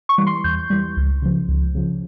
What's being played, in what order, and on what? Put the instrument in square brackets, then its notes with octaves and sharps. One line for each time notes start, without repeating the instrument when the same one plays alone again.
[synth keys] C#6
E3 G3
C6
E2 G6
E3 G3
C#2
C#3 F3
C#2
C#3 F3